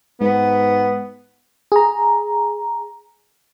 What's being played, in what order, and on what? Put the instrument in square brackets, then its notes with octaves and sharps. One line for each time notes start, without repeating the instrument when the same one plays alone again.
[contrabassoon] G#2 [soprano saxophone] B3
[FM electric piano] G#4 A#5